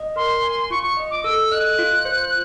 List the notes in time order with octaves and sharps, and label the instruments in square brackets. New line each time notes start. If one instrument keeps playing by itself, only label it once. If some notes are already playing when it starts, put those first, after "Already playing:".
Already playing: [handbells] D#5
[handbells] A#4 [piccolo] C6
[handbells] G#5
[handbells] F4 [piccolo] C#6
[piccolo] C#6
[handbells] D#5
[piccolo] D6
[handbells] A4 [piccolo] E6
[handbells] D#5 [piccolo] F#6
[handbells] F4
C5